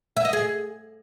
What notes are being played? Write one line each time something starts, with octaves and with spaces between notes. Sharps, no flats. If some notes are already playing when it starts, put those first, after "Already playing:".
E5
D#5
G#4